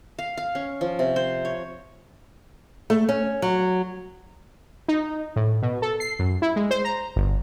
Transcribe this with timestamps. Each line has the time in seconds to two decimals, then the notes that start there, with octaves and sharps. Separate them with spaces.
0.19 F5
0.37 F5
0.55 C#4
0.81 F3
0.99 C3
1.16 C5
1.45 C#5
2.90 A3
3.09 C#4
3.42 F#3
4.88 D#4
5.36 A2
5.62 B2
5.82 A4
6.00 C7
6.19 F#2
6.42 E4
6.56 G#3
6.71 C5
6.85 A#5
7.16 G1